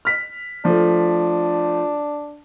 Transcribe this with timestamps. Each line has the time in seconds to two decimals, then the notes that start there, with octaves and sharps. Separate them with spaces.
0.05 F6 B6
0.65 F3 A3 D4